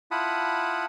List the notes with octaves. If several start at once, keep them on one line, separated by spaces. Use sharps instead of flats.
E4 F4 F#5 A5 B5 D#6